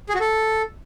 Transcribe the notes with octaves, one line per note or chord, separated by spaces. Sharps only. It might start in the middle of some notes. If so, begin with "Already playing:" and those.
G#4
F#4
A4